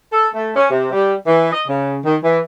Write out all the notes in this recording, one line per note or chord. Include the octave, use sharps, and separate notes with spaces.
A4
A3
C#4
C3
G3
E3
D#5
C#3
D#3
E3